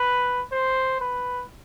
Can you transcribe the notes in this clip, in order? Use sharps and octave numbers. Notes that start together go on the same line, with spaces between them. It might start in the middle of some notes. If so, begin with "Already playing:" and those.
Already playing: B4
C5
B4